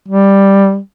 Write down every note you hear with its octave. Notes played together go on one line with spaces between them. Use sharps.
G3